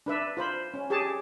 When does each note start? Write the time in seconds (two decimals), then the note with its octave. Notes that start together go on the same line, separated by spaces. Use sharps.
0.06 D4 B4 E5
0.37 F4 C5 B5
0.74 C#4
0.90 G4 G#4 C#5 A5